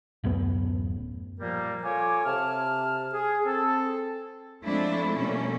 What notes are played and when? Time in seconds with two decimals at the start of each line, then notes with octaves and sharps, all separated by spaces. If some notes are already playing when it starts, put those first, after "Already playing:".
0.23 D1 F#2 A2 B3
1.39 A#2 F3 G3 A#3 A#4
1.84 F4 A4 C#5 G#5 D6
2.25 C3 A5 F6
3.12 G#4
3.45 C4 A4
4.62 F3 G#3 A3 C4 D4 E4
5.15 B2 G3 A3 A#3 C#4